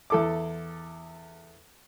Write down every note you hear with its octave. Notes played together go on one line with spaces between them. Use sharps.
E2 A4 D6